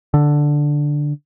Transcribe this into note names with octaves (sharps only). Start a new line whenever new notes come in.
D3